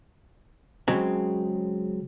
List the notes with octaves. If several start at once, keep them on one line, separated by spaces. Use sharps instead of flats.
C#3 F#3 G#3 C4